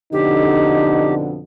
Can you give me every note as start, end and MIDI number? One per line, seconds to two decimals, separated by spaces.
0.13 1.40 41
0.13 1.40 47
0.13 1.40 50
0.13 1.27 63
0.13 1.14 67